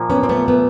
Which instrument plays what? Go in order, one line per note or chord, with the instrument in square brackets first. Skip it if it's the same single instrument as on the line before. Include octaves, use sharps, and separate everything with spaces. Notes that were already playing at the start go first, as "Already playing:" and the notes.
Already playing: [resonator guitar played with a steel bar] A#2 F3
[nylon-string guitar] B3 C#4
C4
A3 B3
A3 B3